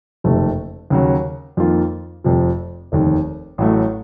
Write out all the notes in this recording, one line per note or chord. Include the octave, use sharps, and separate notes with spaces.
F#1 F2 C3 D#3 A3
D#2 C#3 F#3
F2 D#3 A#3 F4
F1 F2 C3 F3
F1 D#2 D#3
A1 A2 F#3 A3